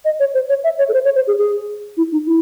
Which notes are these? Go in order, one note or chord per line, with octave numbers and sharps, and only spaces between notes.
D#5
C#5
C5
C#5
E5
C#5
A4
C5
C#5
C5
G#4
G#4
E4
D#4
E4